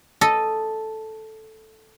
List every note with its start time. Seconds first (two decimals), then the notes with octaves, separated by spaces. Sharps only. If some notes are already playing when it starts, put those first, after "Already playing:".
0.21 A4 D#5